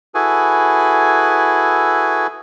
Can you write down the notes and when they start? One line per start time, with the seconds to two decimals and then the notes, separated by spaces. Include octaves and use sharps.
0.15 E4 F#4 G#4 A4 B4 G#5